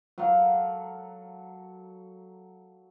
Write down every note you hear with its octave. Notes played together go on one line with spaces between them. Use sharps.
F#3 A4 F5 F#5